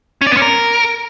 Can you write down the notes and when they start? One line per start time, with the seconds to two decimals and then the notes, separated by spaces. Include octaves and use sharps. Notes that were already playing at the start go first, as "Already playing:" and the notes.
0.21 C#4
0.27 D5
0.32 B3
0.37 C#4
0.42 A#4